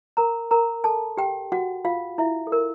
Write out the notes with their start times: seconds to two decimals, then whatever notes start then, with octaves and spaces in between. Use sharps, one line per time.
0.17 A#4 A#5
0.51 A#4 A#5
0.84 A4 A5
1.17 G4 G5
1.52 F#4 F#5
1.85 F4 F5
2.18 E4 E5
2.47 A4
2.52 A#4